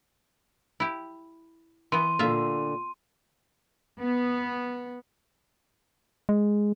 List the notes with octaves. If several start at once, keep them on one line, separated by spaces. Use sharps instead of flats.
E4 G4
E3 B3 C6 D#7
A#2 D3 F4 E5
B3
G#3